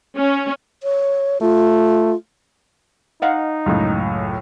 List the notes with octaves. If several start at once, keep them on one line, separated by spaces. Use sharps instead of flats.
C#4
C#5
A3 F4
D#4 D#5 F5 F#5
C#2 F#2 A2